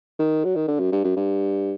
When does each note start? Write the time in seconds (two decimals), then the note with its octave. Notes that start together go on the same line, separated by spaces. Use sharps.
0.19 D#3
0.44 F#3
0.56 D#3
0.68 D3
0.79 F#2
0.92 G2
1.04 F#2
1.16 G2